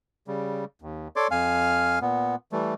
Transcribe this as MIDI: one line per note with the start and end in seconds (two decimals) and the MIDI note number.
0.28 0.65 49
0.28 0.65 55
0.82 1.08 39
1.16 1.28 69
1.16 1.28 73
1.16 1.28 74
1.16 1.28 84
1.16 1.28 86
1.31 1.99 41
1.31 1.99 77
1.31 1.99 80
1.31 1.99 89
2.01 2.35 46
2.01 2.35 59
2.52 2.74 52
2.52 2.74 55
2.52 2.74 57